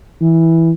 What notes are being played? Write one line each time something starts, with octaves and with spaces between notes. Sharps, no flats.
E3